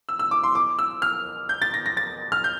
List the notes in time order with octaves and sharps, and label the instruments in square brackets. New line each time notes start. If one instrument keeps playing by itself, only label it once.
[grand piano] E6
E6
D6
C6
D6
E6
F6
G6
A6
A#6
A#6
A6
F6
G6